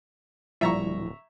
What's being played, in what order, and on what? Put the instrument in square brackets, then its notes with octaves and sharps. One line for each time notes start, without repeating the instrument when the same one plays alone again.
[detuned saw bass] D1 [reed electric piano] A#2 F3 E4 [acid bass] G3 [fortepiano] E5 A#5 C#6